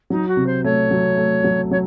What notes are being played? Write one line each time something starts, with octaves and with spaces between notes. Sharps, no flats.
F#3 D#4
F#4
C3
C5
A3 C#5
F#3
A3
F#3
F#3 C#5